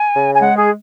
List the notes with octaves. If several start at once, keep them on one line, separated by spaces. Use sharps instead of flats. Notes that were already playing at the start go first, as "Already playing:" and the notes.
Already playing: G#5
C#3
G#5
G#3 F#5
G#4